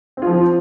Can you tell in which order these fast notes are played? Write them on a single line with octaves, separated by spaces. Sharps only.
C4 F4 F3